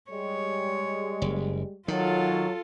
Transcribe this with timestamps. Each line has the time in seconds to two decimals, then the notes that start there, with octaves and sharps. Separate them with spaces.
0.10 G3 G#3 C#5
1.22 F#1
1.88 D#3 F#3 F4 A4